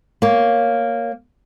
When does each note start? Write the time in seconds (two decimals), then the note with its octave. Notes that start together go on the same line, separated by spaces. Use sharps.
0.22 A#3 C#5